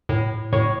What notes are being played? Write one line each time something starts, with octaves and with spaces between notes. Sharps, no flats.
A2
A2 C#5